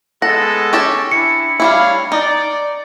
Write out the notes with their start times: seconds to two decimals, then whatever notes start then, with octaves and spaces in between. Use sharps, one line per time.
0.22 G#3 B3 A4 F#5 A#6
0.73 C#4 G4 A5
1.12 D4 E4 C#7
1.60 G3 D4 E4 C#5 F5
2.12 D#4 D5